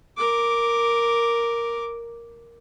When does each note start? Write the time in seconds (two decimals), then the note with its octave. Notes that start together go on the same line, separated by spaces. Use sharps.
0.17 A#4 D6